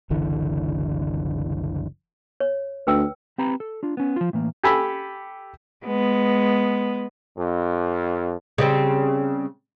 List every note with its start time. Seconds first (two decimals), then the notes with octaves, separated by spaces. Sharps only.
0.10 F#1 C2 D3 E3
2.40 C#5
2.87 D2 B4 G5 E6
3.38 C4 G4 B4 A#5 B5
3.60 A4
3.83 D4 F4
3.97 B3 C#4
4.16 F3 F4
4.33 A2 E3 A#3
4.63 G4 A4 G#5 B5 E6
5.86 G#3 B3
7.37 F2
8.58 C#3 G3 C4